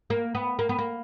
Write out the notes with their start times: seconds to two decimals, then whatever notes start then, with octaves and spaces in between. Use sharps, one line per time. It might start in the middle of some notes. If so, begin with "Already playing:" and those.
0.10 A#3
0.35 B3
0.59 A#3
0.69 B3
0.78 A#3